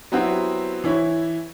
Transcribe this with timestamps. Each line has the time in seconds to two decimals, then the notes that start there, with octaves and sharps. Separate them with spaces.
0.12 F#3 B3 C4 E4 F#4 G4
0.84 E3 E4 C#5